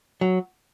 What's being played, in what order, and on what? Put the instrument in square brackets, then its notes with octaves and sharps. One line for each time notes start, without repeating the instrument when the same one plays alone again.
[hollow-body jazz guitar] F#3